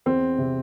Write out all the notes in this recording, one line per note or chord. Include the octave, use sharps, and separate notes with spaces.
E2 C4
C3